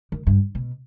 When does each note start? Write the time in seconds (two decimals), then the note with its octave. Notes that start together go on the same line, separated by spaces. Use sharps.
0.12 D#3
0.27 G2
0.55 B2